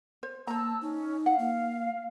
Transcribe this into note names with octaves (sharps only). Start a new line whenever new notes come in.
C5
A#3 C5 A5 A#5 E6
C#4 D#4
F5 F#5
A#3